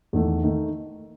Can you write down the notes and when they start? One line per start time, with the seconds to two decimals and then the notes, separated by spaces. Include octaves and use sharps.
0.13 E2 D#3 A3
0.43 D#3 A3